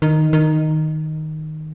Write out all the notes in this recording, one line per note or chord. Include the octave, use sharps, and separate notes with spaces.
D#3
D#3